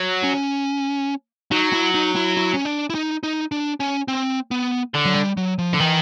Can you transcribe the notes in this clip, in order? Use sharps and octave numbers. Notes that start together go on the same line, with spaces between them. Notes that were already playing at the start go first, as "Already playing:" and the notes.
Already playing: F#3
C#4
F#3 D#4
E4
D#4
E4
E4
C#4
D4
E4
D#4
D#4
D4
C#4
C4
B3
D3
F#3
G3
F#3
F3
D3
D#3 E3